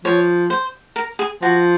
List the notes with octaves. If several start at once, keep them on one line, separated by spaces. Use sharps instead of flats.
F3 C#5
C5
A#4
G#4
F3 F#4